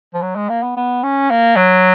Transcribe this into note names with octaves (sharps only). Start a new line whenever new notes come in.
F3
F#3
G#3
A#3
B3
B3
C#4
A#3
F#3